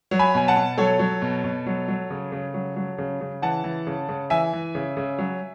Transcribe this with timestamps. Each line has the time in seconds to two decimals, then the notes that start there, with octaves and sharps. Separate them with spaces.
0.11 F#3
0.19 G#5 B5
0.34 B2 G#5
0.48 F#5 A5
0.56 B2
0.78 F#3 A4 C#5
0.99 F#3
1.22 B2
1.44 B2
1.66 F#3
1.88 F#3
2.10 C#3
2.32 C#3
2.54 F#3
2.76 F#3
2.98 C#3
3.21 C#3
3.42 E3 F#5 A5
3.64 E3
3.87 C#3
4.09 C#3
4.30 E3 E5 G#5
4.53 E3
4.75 C#3
4.97 C#3
5.18 F#3